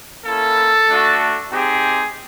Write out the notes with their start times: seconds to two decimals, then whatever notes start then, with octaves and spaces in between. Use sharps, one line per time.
0.25 A#3 C#4 E4 A4
0.89 A3 D4 F#4
1.51 C4 D#4 G4 G#4